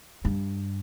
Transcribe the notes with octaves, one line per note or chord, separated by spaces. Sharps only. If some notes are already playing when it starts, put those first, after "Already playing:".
G2